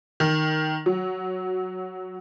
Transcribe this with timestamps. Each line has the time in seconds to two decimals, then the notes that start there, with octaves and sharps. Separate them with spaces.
0.20 D#3
0.86 F#3